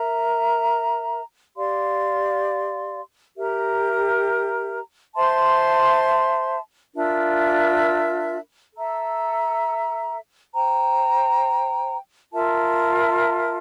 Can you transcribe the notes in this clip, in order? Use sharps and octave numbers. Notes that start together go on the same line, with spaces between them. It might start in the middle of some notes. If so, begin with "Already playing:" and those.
Already playing: A#4 E5 A#5
G4 D5 F5 C6
G4 A#4 E5 A#5
C5 E5 A5 C6
D4 F4 A#4 E5
A4 E5 A#5
C5 G5 A#5
F4 A#4 E5 A5